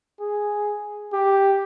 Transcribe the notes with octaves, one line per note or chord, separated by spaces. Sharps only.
G#4
G4